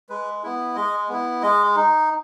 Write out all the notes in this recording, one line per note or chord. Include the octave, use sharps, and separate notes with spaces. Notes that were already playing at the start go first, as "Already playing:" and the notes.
G#3 B4
B3 E4
G#3 D#5
B3 E4
G#3 D#5
D#4